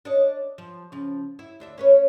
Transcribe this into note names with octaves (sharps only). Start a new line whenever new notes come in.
D4 C#5 D#5
F3
C#3 F3
E4
D2 D4 E5
C#4 B4 C#5